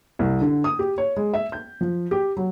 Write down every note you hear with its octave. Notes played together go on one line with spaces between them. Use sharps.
C2
D3
D#6
G4
C#5
G#3
E5
G6
F3
G4
F#3